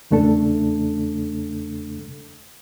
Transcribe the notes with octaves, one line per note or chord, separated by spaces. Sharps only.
E2 C#3 A3 D4 A4